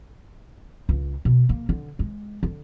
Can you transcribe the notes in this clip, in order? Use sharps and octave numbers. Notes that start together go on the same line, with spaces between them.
C#2
B2
A#3
D3
G#3
D3